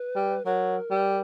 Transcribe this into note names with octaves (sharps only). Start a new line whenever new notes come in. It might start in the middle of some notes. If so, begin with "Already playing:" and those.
Already playing: B4
G3
F#3 A#4
G3